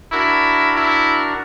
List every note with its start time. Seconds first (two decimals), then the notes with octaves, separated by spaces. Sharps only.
0.12 D4 E4 F#4 A#4
0.76 E4